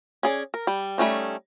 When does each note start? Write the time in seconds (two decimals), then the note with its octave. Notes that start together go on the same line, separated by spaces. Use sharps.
0.23 C#4 G#4 D5
0.54 A#4
0.67 G3
0.98 G3 A3 C#4 D#4